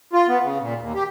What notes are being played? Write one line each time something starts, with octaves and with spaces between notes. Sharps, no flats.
F4
B3
C#3
A#2
D#2
G4